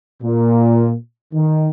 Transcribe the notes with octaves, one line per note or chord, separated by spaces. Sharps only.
A#2
D#3